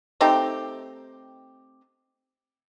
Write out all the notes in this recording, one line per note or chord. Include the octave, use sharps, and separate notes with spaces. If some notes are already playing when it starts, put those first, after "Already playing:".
A3 C4 D#4 G4